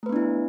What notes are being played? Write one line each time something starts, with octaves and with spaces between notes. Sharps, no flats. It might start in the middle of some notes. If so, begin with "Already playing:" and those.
A3 B3 D4 E4 B4